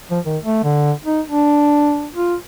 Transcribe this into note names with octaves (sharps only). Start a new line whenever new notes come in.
F3
D#3
A3
D3
D#4
D4
F4